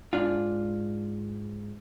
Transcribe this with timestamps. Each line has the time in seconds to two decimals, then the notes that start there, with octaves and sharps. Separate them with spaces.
0.13 G#2 D4 F4